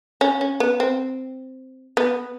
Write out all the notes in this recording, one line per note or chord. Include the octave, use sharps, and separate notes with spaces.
C#4
C#4
B3
C4
B3